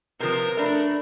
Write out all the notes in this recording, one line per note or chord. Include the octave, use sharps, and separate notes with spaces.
C3 F3 A#4 B4
A3 D4 D5 B5